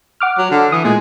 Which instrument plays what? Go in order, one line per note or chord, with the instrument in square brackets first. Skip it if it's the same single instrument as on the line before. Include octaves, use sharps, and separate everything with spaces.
[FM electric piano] F#5 D6 F6
[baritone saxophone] F#3
D3
[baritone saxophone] E3 [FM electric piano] D#6
[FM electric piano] A#2 [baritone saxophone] G#3